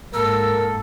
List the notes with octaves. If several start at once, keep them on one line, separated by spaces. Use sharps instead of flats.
G#2 A#3 A4 A#4 E6